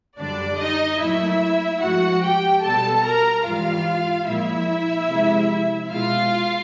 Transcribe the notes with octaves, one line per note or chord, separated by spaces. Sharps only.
F#2 D3 G3 D4 D5
D#4 D#5
A#2 F#3 A3 E4 E5
G#2 F3 A3 F#4 F#5
G4 G5
B2 G3 A4 A5
A#4 A#5
G#2 E3 G3 F4 F5
A#2 F3 G#3 E4 E5
C3 F3 G#3
B2 G#3 F4 F5